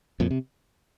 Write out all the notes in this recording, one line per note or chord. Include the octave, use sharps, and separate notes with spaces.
F2 A#2
C3